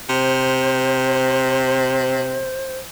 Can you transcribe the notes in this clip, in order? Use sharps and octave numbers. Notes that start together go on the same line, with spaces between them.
C3 C5